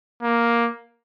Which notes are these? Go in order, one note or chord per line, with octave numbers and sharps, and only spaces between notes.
A#3